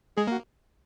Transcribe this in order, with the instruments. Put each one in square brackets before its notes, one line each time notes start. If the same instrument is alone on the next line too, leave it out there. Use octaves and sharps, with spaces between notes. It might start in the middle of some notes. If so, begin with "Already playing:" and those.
[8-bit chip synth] G#3 [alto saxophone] G#4
[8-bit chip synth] A#3 [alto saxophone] F#4